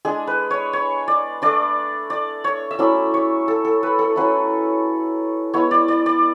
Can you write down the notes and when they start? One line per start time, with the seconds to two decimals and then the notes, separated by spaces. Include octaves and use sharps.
0.05 G#3 D4 G#4
0.27 B4
0.50 C#5
0.73 C#5
1.08 D5
1.42 A3 D4 D5
2.10 D5
2.44 C#5
2.71 E5
2.79 F#3 A3 C#4 E4 D5
3.14 C#5
3.48 A4
3.65 A4
3.83 B4
3.99 A4
4.16 F#3 C#4 E4 B4
5.54 G#3 B3 E4 C#5
5.71 D5
5.88 D5
6.06 D5